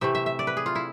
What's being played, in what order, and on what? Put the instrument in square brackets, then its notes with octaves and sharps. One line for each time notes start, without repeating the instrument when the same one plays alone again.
[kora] C3 E3 A3 E5
E5
E5
D5
B4
G#4
F4
E4